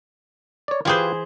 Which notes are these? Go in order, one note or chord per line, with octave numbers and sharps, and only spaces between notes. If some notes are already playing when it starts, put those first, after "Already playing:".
C#5 D5
E3 F4 G4 G#4 B4 C5